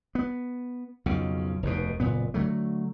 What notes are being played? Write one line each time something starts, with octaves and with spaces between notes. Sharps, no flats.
B3
B1 F2 C#3
F1 D#2 B2
F#1 A#2 B3
D3 F#3 A3